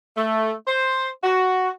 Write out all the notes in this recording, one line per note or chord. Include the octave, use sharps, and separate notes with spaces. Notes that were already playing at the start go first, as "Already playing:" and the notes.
A3
C5
F#4